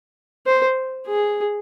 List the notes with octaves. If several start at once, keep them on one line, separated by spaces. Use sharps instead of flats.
C5
G#4